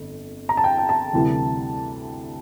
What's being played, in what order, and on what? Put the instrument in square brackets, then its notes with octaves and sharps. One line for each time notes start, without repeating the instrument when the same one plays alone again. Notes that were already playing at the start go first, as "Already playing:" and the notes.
Already playing: [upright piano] G1 F2
A#5
A5
G5
G5
A5
D2 C3 E3 G3